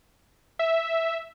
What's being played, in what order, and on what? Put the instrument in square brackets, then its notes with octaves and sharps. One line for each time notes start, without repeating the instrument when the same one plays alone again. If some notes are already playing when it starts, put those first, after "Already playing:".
[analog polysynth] E5